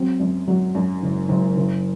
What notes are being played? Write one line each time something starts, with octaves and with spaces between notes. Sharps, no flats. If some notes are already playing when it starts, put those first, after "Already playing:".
Already playing: F#3 C4
F#2
F#3
F#2
F#1
F#1
F#1